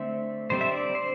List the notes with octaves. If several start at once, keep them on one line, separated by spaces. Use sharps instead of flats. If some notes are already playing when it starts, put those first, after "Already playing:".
Already playing: D3 A3 C4 E5
D3 G3 C4 C5
E5
D5
C5